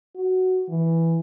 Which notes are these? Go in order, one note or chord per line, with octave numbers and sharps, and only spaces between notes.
F#4
E3